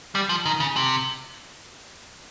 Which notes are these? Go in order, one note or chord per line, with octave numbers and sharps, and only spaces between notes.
G3
F3
D#3
C#3
C3